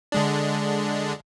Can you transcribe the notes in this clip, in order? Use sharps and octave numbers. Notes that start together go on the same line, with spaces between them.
D3 G#3 D4